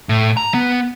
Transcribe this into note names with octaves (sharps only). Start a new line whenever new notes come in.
A2
A#5
B3